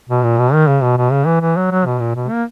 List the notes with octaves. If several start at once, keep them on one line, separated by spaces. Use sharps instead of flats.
B2
A#2
B2
D#3
C#3
B2
B2
C#3
E3
E3
F#3
F#3
B2
A#2
B2
A#3